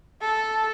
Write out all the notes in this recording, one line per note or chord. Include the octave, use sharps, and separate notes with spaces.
A4